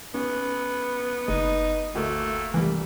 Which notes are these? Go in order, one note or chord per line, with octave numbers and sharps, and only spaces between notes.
B3 C#4
F#1 D#4
D2 A3 A#3
C2 E3 G3